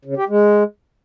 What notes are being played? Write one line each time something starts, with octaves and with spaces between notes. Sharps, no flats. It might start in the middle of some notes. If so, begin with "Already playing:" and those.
C#3
G4
G#3